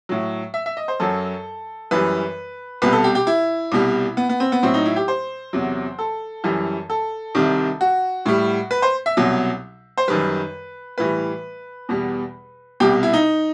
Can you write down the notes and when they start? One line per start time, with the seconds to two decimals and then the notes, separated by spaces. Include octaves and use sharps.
0.09 A2 F#3
0.54 E5
0.66 E5
0.77 D#5
0.88 C5
1.00 F#2 F#3 A4
1.91 F#2 E3 G3 B4
2.82 C2 B2 G3 B4
2.93 A4
3.04 G4
3.15 G4
3.27 E4
3.72 C2 B2 G3
4.17 B3
4.29 B3
4.40 C4
4.52 B3
4.63 A2 F#3 C4
4.74 D#4
4.86 E4
4.96 G4
5.08 C5
5.53 E2 C3 F#3
5.99 A4
6.44 F#2 E3 G3
6.90 A4
7.35 C2 C3 D#3 G3
7.81 F#4
8.26 A2 G3
8.71 B4
8.82 C5
9.06 E5
9.17 C2 B2 F#3
9.98 C5
10.08 F#2 D#3 G3 B4
10.98 A2 E3 G3 B4
11.89 E2 B2 G3
12.80 C2 B2 G3 G4
13.03 E4
13.13 D#4